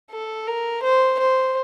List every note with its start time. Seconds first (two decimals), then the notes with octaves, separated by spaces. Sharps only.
0.11 A4
0.47 A#4
0.83 C5
1.20 C5